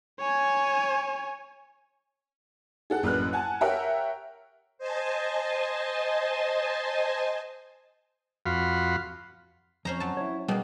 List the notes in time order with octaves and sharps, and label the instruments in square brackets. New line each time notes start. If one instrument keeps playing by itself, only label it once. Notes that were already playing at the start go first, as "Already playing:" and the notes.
[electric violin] C#5 G#5
[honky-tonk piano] G#4 A4 F#5
A1 F#2 A#3 B4 F6 F#6
F#5 G#5 A5
G4 A#4 C#5 E5 F#5 G5
[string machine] C5 D#5 G#5 A5
[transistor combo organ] F2 F#4 F5 B5 C6
[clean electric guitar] F2 [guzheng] C#4 C5 A#5
[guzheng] F#3 A5
[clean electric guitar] E4 C#5
[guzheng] B2 A#3 [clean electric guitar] G3 G#4 G5